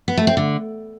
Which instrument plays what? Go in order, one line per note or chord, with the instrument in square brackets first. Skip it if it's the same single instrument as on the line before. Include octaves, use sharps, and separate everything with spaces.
[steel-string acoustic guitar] B3
A3
C4
D3